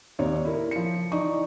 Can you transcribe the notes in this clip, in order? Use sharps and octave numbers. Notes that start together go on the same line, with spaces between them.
D#2 C4 D#4 C#5 D5
E4 A#4
F3 C#7
E3 D#4 D5 C#6